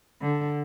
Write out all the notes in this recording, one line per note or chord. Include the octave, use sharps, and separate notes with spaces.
D3